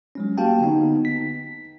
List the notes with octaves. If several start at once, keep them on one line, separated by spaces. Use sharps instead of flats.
F#3 G#3 C#4
A#3 F#4 G4 F5 G5 A5
D3 B3 D#4
B6